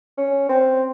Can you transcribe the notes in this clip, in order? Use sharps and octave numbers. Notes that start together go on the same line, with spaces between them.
C#4
C4